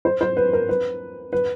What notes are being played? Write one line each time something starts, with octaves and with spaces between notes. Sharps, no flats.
C5
C5
B4
A#4
B4
B4